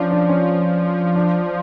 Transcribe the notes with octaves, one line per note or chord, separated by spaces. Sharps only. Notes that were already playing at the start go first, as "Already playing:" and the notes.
Already playing: F3 C#4 D4
D4
C#4
D4